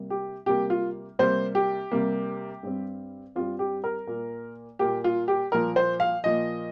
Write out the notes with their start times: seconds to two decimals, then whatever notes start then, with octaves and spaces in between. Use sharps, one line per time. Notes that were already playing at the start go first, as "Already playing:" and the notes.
Already playing: C3 G3 A#3
0.10 G4
0.46 C3 G3 A#3 G4
0.70 F4
1.19 C3 G3 A#3 C5
1.55 G4
1.92 C3 G3 A#3
2.63 G2 G3 C4
3.35 G2 G3 C4 F4
3.59 G4
3.84 A#4
4.07 A#2 A#3
4.79 A#2 A#3 G4
5.04 F4
5.28 G4
5.52 A#2 F3 A#3 A#4
5.76 C5
6.00 F5
6.24 A#2 F3 A#3 D#5